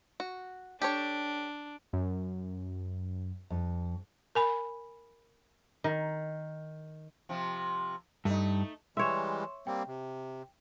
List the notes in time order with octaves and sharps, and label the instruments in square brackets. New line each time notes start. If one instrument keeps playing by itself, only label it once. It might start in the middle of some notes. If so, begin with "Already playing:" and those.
[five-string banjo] F#4
[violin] D4 [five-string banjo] G4 A4 C#5
[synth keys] F#2
[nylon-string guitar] F2
[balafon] A#4 G#5 B5
[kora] D#3
[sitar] C3 F3
[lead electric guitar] G2 [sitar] A3 D#4
[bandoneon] E3 G3 G#3 [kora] C#5 E5 [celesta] C6 E7
[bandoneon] G3 A#3 C4 [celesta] G5
[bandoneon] C3